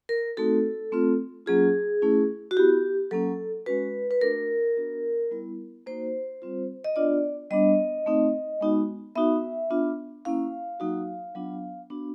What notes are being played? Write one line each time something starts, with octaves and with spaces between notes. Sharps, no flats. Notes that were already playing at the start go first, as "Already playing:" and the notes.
A#4
A3 C4 D#4 F#4 A4
A3 C4 F4
F#3 A#3 C#4 F4 G#4
A3 C#4 E4
F#4
B3 E4 G4
F#3 A#3 C#4 A4
G#3 C#4 F#4 B4
B4
A3 D4 F#4 A#4
B3 D4 F#4
G3 B3 E4
A#3 D#4 F#4 C5
G3 C4 F4
D#5
B3 D4 F4 D5
G3 B3 D4 D#5
A3 C4 D#4
G#3 B3 D#4 F#4
B3 D#4 F#4 E5
B3 D4 F4
A#3 C#4 E4 F5
F#3 A#3 D#4 F#4
F#3 B3 D4 F4
B3 D4 F#4